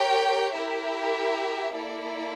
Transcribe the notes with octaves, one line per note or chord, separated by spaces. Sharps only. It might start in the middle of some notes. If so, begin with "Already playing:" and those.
Already playing: G4 A#4 C#5 G5
E4 G4 A#4 E5
A#3 E4 A4 D5